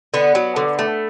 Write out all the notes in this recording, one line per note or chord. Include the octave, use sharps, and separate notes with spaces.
D3 B3
F#3
D3
A3